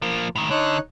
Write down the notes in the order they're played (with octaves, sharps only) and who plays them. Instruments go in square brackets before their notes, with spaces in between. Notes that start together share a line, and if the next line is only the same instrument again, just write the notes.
[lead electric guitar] F3 A#3
A2 D#3
[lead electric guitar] D3 [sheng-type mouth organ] D#4 C#5 F#6